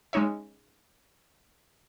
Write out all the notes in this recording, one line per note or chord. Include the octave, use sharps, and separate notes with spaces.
G#3 C#4 D#4 C#5 E5